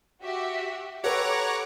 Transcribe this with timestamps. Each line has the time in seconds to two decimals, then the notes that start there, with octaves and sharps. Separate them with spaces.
0.22 F#4 G4 E5
1.04 G4 A4 B4 C#5 F#5 A#5 D6